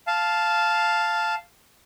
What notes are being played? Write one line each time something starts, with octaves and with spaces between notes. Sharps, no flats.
F5 A5